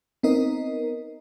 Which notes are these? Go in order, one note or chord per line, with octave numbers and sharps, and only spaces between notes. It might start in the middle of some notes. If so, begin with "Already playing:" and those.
B3 C4 D#4 A#4 D#5